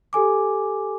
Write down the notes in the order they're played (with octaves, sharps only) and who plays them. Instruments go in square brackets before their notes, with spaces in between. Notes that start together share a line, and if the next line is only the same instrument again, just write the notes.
[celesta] G4 A4 G#5 D6